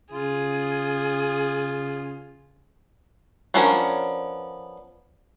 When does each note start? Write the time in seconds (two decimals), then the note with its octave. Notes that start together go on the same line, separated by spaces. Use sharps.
0.12 C#3 F4 G#4
3.54 F3 B3 C#4 D4 A#4